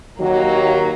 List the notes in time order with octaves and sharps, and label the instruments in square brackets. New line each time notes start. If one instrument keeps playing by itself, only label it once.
[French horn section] D#2 F#3 [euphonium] D#3 [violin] A#3